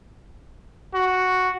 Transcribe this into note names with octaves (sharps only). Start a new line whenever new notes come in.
F#4